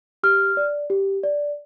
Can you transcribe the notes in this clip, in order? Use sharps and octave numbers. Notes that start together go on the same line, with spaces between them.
G4 F6
D5
G4
D5